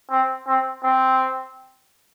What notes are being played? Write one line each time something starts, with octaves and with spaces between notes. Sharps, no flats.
C4
C4
C4